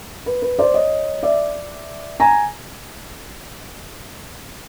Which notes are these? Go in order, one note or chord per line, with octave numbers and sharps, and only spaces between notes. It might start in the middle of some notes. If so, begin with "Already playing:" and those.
B4
B4
C5 D5
C#5 D#5
D5 E5
G#5 A#5